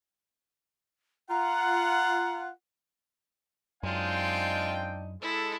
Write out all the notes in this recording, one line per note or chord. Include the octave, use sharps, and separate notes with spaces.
F4 F#5 A#5
F#2 G#3 C4 D4 D#4 F4 F5 G5
G#3 E4 A4